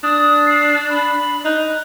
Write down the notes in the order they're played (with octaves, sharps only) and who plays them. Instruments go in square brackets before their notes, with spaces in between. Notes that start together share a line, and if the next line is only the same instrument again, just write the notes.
[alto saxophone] D4 [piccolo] D#6
[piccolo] C7
B5
[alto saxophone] D#4 [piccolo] F#6